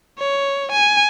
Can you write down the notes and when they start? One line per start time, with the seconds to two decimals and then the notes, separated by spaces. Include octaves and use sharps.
0.19 C#5
0.72 G#5